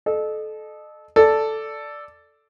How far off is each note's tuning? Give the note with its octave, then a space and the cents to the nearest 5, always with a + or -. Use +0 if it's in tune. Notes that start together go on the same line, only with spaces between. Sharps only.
A4 -25 D#5 -35
A4 +0 D5 +0